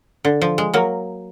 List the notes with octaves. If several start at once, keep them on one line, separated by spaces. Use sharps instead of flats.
D3
F3
G#3
F#3 A#3